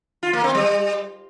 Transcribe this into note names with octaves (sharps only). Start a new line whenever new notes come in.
F4
A#3
C4
G3